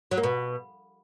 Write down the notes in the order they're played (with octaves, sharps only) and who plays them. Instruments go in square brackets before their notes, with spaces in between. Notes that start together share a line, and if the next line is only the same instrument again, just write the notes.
[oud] F#3
A#3
B2